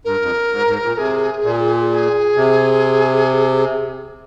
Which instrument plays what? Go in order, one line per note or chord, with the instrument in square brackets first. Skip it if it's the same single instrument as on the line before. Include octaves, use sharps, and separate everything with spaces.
[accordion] G2 [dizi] A#4
[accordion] F2
G#2
G#2
A#2
[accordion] C3 [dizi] G#4
[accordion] A#2
[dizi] G#4
[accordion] C3